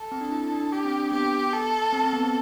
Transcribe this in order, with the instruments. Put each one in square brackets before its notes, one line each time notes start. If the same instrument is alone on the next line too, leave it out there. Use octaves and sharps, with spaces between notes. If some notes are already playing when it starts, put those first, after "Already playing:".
Already playing: [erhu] A4
[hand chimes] C4
D4
E4
D4
[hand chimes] D4 [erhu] G4
[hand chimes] C4
D4
[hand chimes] B3 [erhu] G4
[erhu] A4
[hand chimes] C4
C4
B3
C4